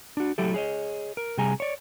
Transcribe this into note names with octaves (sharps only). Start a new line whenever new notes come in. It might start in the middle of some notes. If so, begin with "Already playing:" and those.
D4 F#4
F#3 A3 E4 G4 A4
G#4 C#5 D#5
A#4
C3 G3 G#4 G#5 A#5
C#5 D5